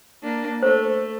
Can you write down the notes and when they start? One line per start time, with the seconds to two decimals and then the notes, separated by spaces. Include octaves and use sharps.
0.23 A#3 D4
0.63 A3 C5